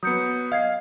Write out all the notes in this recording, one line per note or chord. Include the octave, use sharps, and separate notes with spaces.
F#3 B3 D#6 G6 C#7
D#5 F5 G#6 C7